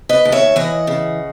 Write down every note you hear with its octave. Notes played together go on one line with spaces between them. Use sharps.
B4 D#5
D#2
C#5 E5
E3 D#5 F#5
C#3